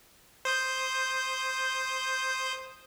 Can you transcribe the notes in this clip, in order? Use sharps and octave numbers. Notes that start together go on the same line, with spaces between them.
C5 D#6 G6